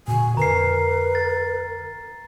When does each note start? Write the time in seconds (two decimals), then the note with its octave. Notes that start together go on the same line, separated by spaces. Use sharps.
0.08 A#2 D3 F#4 G#5
0.37 F2 D3 A#4 B4 A#5 C7
1.15 A6